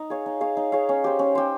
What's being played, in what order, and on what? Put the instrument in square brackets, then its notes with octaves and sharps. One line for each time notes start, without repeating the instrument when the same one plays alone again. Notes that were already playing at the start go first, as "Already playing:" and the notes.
Already playing: [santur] D#4
G#4 C#5 F5
D#4
G#4 C#5 F5
D#4
G#4 C#5 F5
C#4
G4 C5
C#4
G4 C5